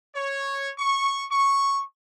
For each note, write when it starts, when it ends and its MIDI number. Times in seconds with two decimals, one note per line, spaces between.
0.13 0.69 73
0.77 1.23 85
1.30 1.81 85